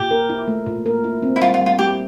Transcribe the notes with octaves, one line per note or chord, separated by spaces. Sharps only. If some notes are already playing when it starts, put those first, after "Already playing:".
Already playing: A#2 G4
A#4
E4
A3
A#2
A#4
E4
C4
E4
G3 F4
F4
G3
F4
E4 G4